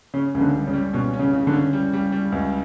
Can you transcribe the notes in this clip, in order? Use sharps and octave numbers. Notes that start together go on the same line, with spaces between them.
C#3 C#4
C#2 C#3
D3
G3
C#3
G3
B2 C#4
C#4
C#3
C#3
D3
C#4
G3
G3
G3
C#2